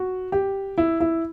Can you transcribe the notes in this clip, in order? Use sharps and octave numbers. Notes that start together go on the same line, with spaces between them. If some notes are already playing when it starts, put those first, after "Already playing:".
Already playing: F#4
G4
E4
E4